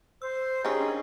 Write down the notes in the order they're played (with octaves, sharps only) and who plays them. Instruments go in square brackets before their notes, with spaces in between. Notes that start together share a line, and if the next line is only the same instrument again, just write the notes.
[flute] C5 [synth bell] E6
[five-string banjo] D#3 C#4 [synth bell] G4 [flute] G#4
[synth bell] D4